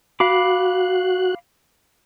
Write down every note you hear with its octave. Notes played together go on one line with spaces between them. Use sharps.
F#4 F5 B5 D6 F#6